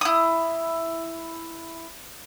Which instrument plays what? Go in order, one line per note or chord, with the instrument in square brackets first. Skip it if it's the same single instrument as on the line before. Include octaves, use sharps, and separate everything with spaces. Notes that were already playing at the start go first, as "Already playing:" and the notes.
[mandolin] E4 D#6